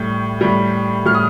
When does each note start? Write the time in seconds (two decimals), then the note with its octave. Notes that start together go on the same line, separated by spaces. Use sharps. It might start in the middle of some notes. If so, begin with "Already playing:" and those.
Already playing: A2 G3 G6
0.41 A2 G3
1.05 A2 G3 F6
1.15 D#6